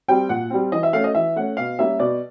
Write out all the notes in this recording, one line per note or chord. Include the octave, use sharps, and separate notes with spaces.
G3 C4 G5
A#2 F#5
G3 C4
E3 D#5
E5
A3 C#4 F5
D#5
E3 E5
A3 C#4 F#5
B2 F5
G3 A#3 C#4 E5
B2 D5